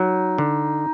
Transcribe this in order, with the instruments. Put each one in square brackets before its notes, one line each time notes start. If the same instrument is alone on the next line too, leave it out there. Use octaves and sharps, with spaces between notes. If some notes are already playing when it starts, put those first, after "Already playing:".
Already playing: [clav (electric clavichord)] F#3 [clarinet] D#4
[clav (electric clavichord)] D3